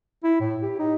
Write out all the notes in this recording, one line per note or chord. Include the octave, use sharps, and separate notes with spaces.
E4
A2
G4
D#4